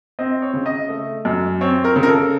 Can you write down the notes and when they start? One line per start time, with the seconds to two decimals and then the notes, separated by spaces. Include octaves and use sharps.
0.19 C4 D#5
0.42 C#5
0.53 C#3
0.66 D#5
0.89 A3
1.25 F#2
1.61 C4 C#5
1.84 A#4
1.96 C#3
2.03 A#4
2.08 A4